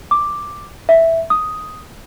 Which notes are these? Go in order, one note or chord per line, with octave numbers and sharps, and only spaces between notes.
D6
E5
D#6